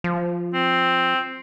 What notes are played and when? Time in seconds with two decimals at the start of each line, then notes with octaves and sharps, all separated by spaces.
0.04 F3
0.54 C4